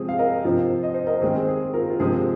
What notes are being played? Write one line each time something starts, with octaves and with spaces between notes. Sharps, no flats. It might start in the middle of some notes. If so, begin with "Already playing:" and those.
Already playing: C3 F3 G#3 C4 G#4
F5
A#4 D#5
C3 F3 C4 F4
D#5
C5
A#4 D#5
D#3 G#3 C4 G#4 C5
G#4
F4 A#4
F4
C3 F3 G#3 C4 G#4